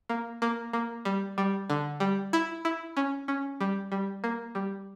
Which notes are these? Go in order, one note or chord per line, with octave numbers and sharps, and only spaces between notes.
A#3
A#3
A#3
G3
G3
D3
G3
E4
E4
C#4
C#4
G3
G3
A#3
G3